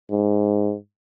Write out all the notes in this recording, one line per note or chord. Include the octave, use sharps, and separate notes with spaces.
G#2